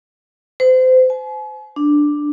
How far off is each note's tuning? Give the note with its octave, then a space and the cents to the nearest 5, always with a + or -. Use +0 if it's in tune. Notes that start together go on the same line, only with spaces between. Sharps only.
C5 -30
G#5 +45
D4 +5